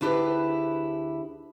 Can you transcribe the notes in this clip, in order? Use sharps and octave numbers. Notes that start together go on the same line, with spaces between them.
D2 D4 E4 G4 G#4 B4